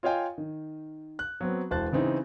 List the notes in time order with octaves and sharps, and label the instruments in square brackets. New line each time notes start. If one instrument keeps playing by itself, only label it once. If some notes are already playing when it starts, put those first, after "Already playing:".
[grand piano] F4 C#5 D#5 F5 G5 G#5
D#3
F#6
F#3 B3 C4
E1 E3 C5 A5 F#6 A6
C#3 E3 C4 D#4